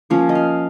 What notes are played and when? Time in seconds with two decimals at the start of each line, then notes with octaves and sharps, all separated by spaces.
0.10 F3 A#3 C#4
0.29 D#5
0.35 F5